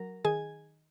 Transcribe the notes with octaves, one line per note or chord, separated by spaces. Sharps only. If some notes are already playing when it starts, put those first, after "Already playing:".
Already playing: F#3 A#4
D#3 G#4 G#5